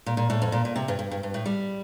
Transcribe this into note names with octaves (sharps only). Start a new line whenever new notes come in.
A#2
A#2
A2
F2
A#2
A#2
C3
G2
G2
G2
G2
A2
G3